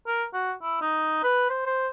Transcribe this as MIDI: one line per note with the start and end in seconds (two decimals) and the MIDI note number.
0.07 0.24 70
0.34 0.52 66
0.62 0.80 64
0.81 1.22 63
1.24 1.48 71
1.50 1.62 72
1.66 1.89 72